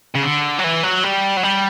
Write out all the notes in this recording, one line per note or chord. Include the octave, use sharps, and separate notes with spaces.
C#3
D3
F#3
E3
F#3
G3
F#3
G3